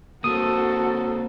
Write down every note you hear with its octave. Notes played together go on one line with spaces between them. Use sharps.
A#3 C4 F#4 A4 D#6